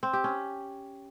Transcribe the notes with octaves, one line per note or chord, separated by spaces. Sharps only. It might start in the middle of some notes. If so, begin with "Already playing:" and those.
C4
G4
C#4